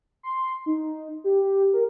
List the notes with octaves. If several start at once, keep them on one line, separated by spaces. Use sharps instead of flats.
C6
D#4
G4
A#4